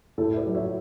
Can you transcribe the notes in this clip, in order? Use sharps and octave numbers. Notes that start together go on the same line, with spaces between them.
A2 A4
E5
B4 D5
F#3
C#5 E5